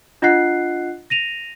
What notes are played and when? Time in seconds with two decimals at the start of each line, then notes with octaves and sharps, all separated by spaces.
0.22 D4 F4 D#5 F#5 F#6 C7
1.10 A#6 D#7 F7